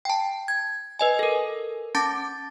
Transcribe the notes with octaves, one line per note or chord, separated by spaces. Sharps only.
G5 A5
G#6
B4 D#5 G#5
A4 A#4
C#4 A5 D6 A6